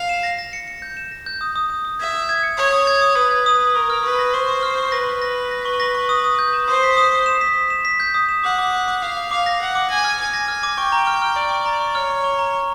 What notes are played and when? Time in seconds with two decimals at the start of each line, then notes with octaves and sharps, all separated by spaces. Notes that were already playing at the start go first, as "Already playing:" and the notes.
Already playing: F5
0.09 E7
0.23 A#6
0.39 A#6
0.53 C#7
0.68 C#7
0.82 G6
0.97 E7
1.12 A#6
1.26 G6
1.41 D#6
1.56 D#6
1.70 D#6
1.85 D#6
1.99 E5 G#6
2.14 D#6
2.29 G#6
2.43 C#7
2.58 C#5 D#6
2.72 D#6
2.87 G#6
3.02 D#6
3.16 B4 D#6
3.31 G#6
3.46 D#6
3.60 D#6
3.75 A#4 C#6
3.90 F6
4.04 B4 C#6
4.19 A#6
4.34 C5 C#6
4.48 C#6
4.63 F6
4.78 C#6
4.92 B4 A#6
5.06 C#6
5.22 A#6
5.36 A#6
5.51 A#6
5.65 C#6
5.80 A#6
5.95 C#6
6.09 D#6
6.24 D#6
6.39 G6
6.53 E7
6.68 C5 D#6
6.83 B6
6.97 D#6
7.12 D#6
7.26 E7
7.41 B6
7.56 D#6
7.70 E7
7.85 B6
8.00 G6
8.14 D#6
8.29 E7
8.44 F#5 D6
8.58 D6
8.73 D6
8.88 D6
9.02 F5 D6
9.17 D6
9.31 F5 D6
9.46 A#6
9.60 F#5 A#6
9.75 D6
9.90 G#5 A#6
10.04 F6
10.19 G#5 D6
10.34 A#6
10.48 F6
10.63 D6
10.77 G5 C#6
10.92 A#5
11.07 F6
11.22 F6
11.36 D5 C#6
11.51 C#6
11.66 A#5
11.81 C#6
11.95 C#5 F6
12.10 C#6
12.24 C#6
12.39 A#5
12.53 C#6